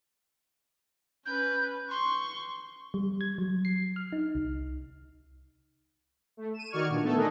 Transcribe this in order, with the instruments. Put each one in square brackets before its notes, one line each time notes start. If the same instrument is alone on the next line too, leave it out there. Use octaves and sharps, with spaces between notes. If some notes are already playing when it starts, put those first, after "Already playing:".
[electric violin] C#4 B4 [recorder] G6
[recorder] C6 [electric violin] C#6
[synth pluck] G3
G#6
F#3
C7
F6
D#4
C2
[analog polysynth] A3
D#7 E7
D#3 F#4 D5 C#6 F6 G#6
A#2 D3 E3
A3 B3 A4
D4 D#4 G#4 A#4 B4 D#5